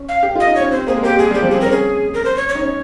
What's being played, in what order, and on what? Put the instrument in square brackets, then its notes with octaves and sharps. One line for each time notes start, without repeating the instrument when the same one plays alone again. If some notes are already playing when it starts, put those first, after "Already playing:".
Already playing: [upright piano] C#4
[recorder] F5
[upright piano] G4
[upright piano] F4 [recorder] D#5
[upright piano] D#4
[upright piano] C#4 [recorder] C#5
[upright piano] C4 [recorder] C5
[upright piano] A#3 [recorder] G#4
[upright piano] G#3
[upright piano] A#3 [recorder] G4
[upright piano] G#3 [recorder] G#4
[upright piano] G3 [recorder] G4
[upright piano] F3
[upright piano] C4 [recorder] G#4
[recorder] A#4
[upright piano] C#4
[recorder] G#4
A#4
C5
C#5
C#5
[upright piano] D#4
C#4